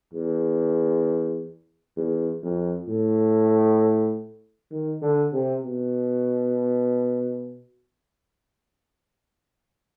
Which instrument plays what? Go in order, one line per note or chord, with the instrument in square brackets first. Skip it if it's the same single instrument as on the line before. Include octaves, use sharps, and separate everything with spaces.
[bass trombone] E2
E2
F2
A2
D#3
D3
C3
B2